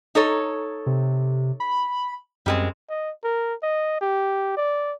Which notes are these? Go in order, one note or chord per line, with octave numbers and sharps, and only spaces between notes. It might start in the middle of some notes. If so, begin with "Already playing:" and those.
D#4 A4 C#5
C3
B5
F#2 G3 G#3 C4
D#5
A#4
D#5
G4
D5